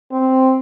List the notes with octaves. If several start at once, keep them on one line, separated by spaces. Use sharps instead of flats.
C4